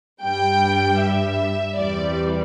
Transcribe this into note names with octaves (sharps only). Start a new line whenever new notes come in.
G2 G3 G5
E5
E2 C3 E3 G3 D5